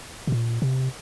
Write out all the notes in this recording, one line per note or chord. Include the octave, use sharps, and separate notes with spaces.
B2
A#2
C3